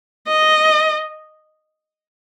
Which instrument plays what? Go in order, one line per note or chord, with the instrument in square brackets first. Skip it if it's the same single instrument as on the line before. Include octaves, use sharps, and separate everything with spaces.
[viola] D#5